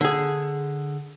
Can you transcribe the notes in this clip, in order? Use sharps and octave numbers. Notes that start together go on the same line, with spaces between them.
D3 G#4